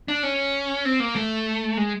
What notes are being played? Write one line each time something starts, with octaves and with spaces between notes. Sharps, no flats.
D4
C#4
C4
A#3
A3
G#3